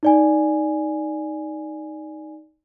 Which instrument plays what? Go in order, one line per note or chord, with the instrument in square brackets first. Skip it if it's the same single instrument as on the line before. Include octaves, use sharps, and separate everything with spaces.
[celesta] D#4 D5 G#5